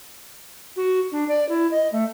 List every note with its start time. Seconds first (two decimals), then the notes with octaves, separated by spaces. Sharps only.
0.76 F#4
1.12 D4
1.29 D5
1.49 E4
1.71 D#5
1.92 A3